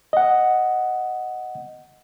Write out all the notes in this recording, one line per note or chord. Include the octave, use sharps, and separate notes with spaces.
D#5 F#5